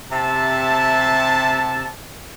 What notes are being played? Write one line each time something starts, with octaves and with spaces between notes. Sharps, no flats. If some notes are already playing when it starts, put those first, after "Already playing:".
C3 E5 A5